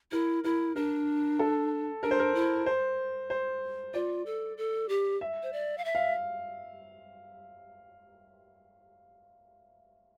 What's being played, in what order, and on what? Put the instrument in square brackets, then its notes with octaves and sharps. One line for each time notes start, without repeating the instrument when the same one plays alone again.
[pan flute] E4 [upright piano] A#4
[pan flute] E4 [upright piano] A#4
[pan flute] D4 [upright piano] A#4
[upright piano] A4
[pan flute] D4 [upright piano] A#4
[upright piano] C5
A#4
[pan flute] E4
[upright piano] C5
C5
[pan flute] F4 [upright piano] D5
[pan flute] A4
A4
G4
[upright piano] E5
[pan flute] C5
D5
F5
E5
[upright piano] F5